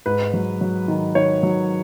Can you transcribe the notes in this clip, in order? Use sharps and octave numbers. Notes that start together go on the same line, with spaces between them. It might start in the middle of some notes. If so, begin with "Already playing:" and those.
G#2 B4
F#3
F#3
D#3
D#3 C#5
F#3